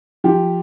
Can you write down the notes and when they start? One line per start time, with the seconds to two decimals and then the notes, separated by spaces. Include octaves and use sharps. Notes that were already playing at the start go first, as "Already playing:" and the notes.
0.24 F3 G4